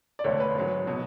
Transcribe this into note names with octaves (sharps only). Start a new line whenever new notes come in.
D5
E1 D2 D3 C#5
B4
G#1 G#2 F#3
B2 F#3